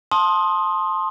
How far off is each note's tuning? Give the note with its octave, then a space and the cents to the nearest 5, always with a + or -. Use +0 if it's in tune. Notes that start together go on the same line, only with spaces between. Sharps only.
A5 +0 C6 +15 D#6 +0